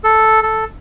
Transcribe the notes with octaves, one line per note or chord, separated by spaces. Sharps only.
A4
A4